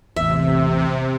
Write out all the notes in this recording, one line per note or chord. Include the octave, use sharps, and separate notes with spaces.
A1 E2 C3 E5